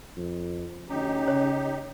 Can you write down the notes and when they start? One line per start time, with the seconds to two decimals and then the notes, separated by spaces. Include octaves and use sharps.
0.17 F2
0.89 D2 C#4 D#4 G4
1.28 C#3 C#5